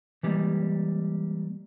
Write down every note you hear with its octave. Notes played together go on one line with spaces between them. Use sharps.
E3 G3 G#3 A#3